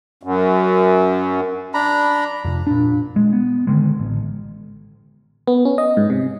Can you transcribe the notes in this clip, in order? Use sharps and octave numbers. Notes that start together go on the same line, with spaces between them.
F#2
D4 A#5 B5
F2 C3
A#2 D4
G#3
B3
D3 D#3 G#3
A1
B3
C#4
D#5
G#2
C3